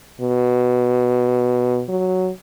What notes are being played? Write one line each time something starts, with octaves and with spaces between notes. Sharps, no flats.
B2
F#3